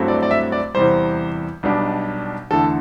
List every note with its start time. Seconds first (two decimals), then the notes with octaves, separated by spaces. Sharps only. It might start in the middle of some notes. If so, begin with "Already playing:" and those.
Already playing: G2 F#3 A3 C4 E4
0.08 D5
0.23 D5
0.31 E5
0.52 D5
0.75 E2 C3 G3 C5
1.63 B1 B2 G3 D4
2.51 E2 D3 A3 A4